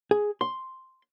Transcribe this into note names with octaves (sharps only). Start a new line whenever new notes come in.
G#4
C6